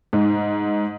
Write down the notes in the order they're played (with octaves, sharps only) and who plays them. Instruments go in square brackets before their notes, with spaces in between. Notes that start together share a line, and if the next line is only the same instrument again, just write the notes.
[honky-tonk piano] G#2